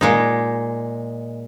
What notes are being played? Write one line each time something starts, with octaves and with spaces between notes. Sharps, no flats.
A#2 G#3 D#4